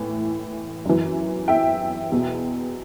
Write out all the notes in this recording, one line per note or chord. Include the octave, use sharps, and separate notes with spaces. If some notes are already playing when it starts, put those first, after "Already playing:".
Already playing: A2 E3
F#2 E3
E5 G5
E2 B2